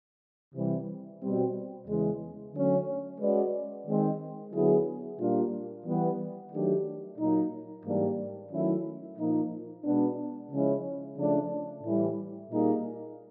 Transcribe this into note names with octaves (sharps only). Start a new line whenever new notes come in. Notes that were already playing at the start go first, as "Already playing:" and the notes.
C3 E3 G3
B2 G3 C4
E2 C#3 E3 G#3
D3 F#3 A3 C#4
G#3 C#4 F#4 B4 D5
D#3 G#3 C4
D3 F#3 B3 E4 G#4
A#2 G3 A#3 D4 F4
E3 G3 B3
D#3 F#3 A3 D4 G4
A#2 F#3 A#3 D#4
G#2 E3 G3 A#3 D4
D#3 F#3 A3 C#4 E4
A#2 F3 A#3 D#4
B2 G#3 B3 D4
C#3 F3 G#3 C#4 E4
C#3 F3 A3 D4
A2 E3 G3
A#2 G3 A#3 D#4 G#4